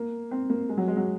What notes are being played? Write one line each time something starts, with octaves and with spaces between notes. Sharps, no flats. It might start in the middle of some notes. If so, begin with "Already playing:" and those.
Already playing: A#3
C4
A#3
G#3
F#3
G#3
F#3